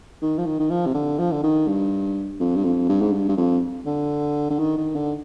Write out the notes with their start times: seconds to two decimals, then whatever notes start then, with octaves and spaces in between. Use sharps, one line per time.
0.22 D#3
0.38 F3
0.46 D#3
0.59 D#3
0.70 F3
0.86 C3
0.94 D3
1.19 F3
1.32 D3
1.43 D#3
1.67 G2
2.40 F2
2.56 G2
2.64 F2
2.89 G2
3.01 G#2
3.12 G2
3.28 G2
3.37 F2
3.86 D3
4.50 D3
4.59 D#3
4.77 D#3
4.95 D3